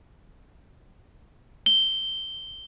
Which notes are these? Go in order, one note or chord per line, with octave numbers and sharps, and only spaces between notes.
G7